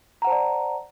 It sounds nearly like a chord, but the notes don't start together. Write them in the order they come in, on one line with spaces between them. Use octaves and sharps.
A#5 F#5 C5 A5 D5